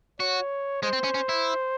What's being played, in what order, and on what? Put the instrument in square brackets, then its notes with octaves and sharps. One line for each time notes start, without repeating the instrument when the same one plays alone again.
[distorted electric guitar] F#4 [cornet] C#5
[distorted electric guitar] G#3 [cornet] C5
[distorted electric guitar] C4
C#4
C#4
E4